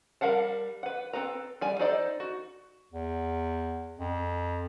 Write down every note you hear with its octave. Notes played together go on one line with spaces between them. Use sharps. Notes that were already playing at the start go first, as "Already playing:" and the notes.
G3 A#4 F5 F#5 A5
B4 F#5
C4 A4 B4 A#5
G3 D5 G#5
D#4 A4 C5 D5 D#5
F#4
E2
F2